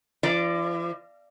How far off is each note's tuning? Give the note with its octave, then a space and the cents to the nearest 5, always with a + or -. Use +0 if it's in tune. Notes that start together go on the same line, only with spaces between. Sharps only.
F3 -45 D5 +0